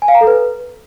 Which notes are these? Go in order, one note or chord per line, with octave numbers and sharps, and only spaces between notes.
G#5
F5
A#5
A4
B4